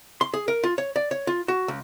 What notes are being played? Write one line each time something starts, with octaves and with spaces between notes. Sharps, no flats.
C6
G#4
A#4
F4
C#5
D5
C#5
F4
F#4
C#2